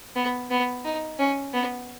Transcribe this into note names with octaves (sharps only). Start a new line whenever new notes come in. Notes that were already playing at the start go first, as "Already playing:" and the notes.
B3
B3
D#4
C#4
B3